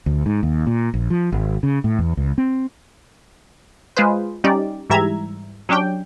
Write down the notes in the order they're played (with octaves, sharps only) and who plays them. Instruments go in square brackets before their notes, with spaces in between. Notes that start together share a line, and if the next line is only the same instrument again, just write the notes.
[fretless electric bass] D2
G#2
D#2
A#2
A#1
F3
G#1
C#3
A2
E2
C#2
C4
[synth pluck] G#3 F4 G#4 B4 C5
G3 C#4 D#4 G4 D5
G#2 E3 G3 E5 A#5 G#6
F#3 C#4 D4 G4 G5